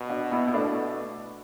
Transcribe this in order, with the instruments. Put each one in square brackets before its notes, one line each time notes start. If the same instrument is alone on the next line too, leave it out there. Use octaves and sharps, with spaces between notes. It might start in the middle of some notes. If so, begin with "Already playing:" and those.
Already playing: [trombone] B2
[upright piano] D4 F#4
B3 E4
E4
A3 D4